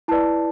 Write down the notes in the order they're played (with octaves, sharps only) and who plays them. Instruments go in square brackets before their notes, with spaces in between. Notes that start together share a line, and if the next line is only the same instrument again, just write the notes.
[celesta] E4 B4 D5 A5